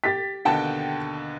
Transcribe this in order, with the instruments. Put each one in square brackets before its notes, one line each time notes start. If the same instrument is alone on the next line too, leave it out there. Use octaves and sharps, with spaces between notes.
[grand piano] G4 [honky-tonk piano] A6 B6
[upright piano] D#2 B2 D3 [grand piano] F#5 G5 A5